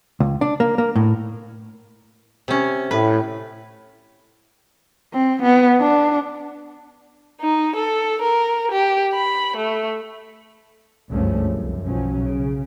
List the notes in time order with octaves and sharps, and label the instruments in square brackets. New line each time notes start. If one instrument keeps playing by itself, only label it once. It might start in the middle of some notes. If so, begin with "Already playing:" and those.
[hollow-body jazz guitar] C#2
D4
A#3
A#3
A2
[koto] C3 C#4
[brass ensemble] A2 [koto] B4
[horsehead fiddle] C4
B3
D4
[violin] D#4
A4
A#4
G4
B5
A3
[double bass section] F#1 C#2 G2 F3 A3 C#4
C2 F#2
B1 F3 F#3 C#4
C#3